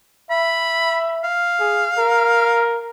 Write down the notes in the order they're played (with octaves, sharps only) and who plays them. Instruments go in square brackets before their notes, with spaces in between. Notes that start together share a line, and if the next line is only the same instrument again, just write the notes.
[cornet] E5 [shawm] B5
[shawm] F5
[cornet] G#4
A#4